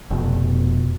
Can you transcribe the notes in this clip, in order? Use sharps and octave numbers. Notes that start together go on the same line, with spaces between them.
F1 B2